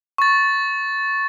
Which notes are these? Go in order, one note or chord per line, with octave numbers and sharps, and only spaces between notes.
C#6 A6